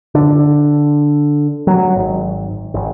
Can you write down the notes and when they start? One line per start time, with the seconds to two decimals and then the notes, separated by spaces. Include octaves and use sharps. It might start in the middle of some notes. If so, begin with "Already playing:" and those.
0.15 D3
1.67 F#3
1.96 G#1
2.74 G#1